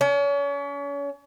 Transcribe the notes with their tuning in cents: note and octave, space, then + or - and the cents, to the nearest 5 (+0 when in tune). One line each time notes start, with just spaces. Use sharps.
C#4 +35